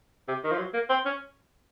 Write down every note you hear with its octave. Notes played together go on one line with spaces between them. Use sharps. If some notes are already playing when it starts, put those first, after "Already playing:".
C3
D#3
F3
F#3
A#3
C4
C#4